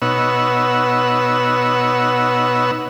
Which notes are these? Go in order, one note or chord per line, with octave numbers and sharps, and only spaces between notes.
B2 B3 D#4 C#5 F#5 E6